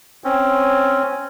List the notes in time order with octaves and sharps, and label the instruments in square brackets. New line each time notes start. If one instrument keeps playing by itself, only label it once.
[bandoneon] C4 C#4